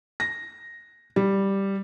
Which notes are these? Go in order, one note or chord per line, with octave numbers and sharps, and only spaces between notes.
A#6
G3